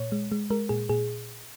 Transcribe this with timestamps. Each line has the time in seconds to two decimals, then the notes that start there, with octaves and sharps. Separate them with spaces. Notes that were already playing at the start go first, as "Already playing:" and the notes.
Already playing: A#2 C#5
0.12 G#3
0.32 G#3
0.50 G#3 A#4
0.69 A#2 G#4
0.89 A#2 G#4